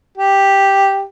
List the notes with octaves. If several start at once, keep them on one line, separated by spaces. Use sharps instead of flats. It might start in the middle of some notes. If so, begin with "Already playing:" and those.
G4